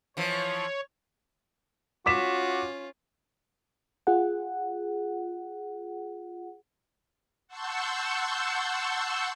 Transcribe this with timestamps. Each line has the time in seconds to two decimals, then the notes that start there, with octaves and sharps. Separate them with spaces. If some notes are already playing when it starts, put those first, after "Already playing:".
0.17 E3 F3 C#5
2.06 C#4 F4 F#4 D6 B6 E7
4.07 F4 G#4 F#5
7.47 F#5 A5 C6 C#6 E6 G6